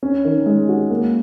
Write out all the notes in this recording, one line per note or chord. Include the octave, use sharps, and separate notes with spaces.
C#4
D#3
G#3
F#4
A#3